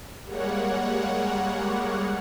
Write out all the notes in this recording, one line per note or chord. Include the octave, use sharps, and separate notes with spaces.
G3 G#3 A#3 C#5 F#5